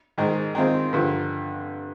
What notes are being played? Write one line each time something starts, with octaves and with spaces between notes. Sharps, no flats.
G#2 D#3 G#3
D#3 G#3 C4 F4
G2 D3 F3